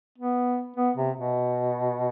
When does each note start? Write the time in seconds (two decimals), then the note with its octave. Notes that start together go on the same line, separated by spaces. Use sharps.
0.18 B3
0.76 B3
0.97 C3
1.17 B2